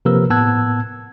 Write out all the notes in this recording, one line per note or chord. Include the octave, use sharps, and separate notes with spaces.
C3 F3 A#3 A#4 B4 E6
A2 B3 A5 E6 F#6 G#6